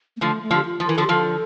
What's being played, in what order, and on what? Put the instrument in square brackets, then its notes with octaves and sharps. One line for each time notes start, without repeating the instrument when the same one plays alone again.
[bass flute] A#3
[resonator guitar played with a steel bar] D3 F3 [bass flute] A3
[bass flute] A3
[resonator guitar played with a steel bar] D3 F3
[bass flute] G4
F4
[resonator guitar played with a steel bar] F3
[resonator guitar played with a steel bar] E3 [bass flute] A#4
[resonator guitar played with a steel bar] D3 F3 [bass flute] A4
[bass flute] G4
[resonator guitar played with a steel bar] D3 F3 [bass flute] A4